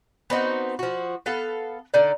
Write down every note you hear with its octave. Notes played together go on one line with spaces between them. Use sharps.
B3 C4 D#4 F#4
F3 F#4
B3 A4 F5
D3 D#4 D5